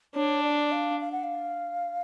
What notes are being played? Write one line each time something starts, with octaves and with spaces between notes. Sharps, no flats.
D4 C#5
D5
F5
F5
F#5
F5